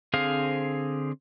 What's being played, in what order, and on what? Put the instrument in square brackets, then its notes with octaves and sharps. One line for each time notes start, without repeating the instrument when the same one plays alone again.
[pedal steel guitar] D3 C4 G#4 C5 F5